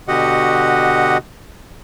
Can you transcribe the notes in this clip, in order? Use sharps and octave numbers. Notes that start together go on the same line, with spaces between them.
B2 D3 F#4 G4 D#5 F#5